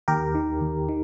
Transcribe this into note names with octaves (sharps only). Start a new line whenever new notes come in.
D#2 G4 A#4
D#3
D#2
D#3